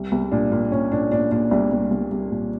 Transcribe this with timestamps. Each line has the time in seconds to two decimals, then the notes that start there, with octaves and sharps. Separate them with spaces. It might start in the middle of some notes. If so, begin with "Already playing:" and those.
Already playing: C2
0.12 C2
0.32 A#2 D4
0.51 A#2
0.72 A#2 C#4
0.92 A#2 D4
1.12 A#2 D4
1.31 A#2 D4
1.51 C2 D4
1.71 C2
1.91 C2
2.11 C2
2.31 A#2